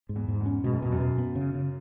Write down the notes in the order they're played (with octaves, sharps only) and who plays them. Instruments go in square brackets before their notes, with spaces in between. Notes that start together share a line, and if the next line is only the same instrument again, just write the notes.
[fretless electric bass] G#2
[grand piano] E2
[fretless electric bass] G#2
[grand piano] E2
[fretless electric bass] C#4
[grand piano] G#2 [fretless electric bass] B2
[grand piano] F#2
[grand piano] E2 [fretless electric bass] B2
[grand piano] F#2
[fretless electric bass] B2
B3
C#3
C#3